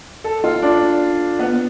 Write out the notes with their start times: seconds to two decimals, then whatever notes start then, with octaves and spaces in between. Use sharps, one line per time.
0.24 A4
0.44 F4
0.62 D4
1.39 B3